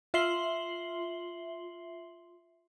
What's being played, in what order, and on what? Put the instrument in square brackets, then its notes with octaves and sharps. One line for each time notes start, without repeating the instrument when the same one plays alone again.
[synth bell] F4 E5 C6 C7 F#7 G7